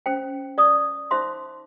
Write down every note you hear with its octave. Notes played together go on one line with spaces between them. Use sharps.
C#4 C5 G5
D5 D#6
D#4 C5 E5 C6 D6